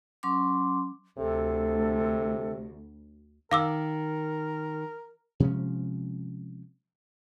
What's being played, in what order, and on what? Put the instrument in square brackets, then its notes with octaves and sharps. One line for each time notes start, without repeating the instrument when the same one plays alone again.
[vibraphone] F#3 C#4 C6 D6
[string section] D2 [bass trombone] C3 [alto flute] A4
[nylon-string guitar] D#3 [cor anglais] A#4 [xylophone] F5 D6 E6
[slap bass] C3 F3 G#3 C#4